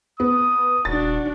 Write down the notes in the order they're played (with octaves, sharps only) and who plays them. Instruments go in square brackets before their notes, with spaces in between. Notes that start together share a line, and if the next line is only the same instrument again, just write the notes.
[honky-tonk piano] B3 [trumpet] D#6
[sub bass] D#1 [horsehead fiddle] D4 F#4 [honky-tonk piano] A6